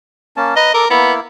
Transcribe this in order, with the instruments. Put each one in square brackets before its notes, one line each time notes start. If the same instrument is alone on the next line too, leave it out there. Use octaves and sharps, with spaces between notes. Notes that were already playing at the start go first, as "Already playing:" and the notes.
[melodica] A#3 C#4 A5
[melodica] B4 A#5 [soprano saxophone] D#5
[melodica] A4 D6 [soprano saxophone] A#4
[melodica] A#3 E4 [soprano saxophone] B3